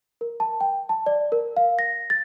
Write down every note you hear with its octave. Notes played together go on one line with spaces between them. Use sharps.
A#4
A5
G5
A5
D5
A#4
F5
A#6
A6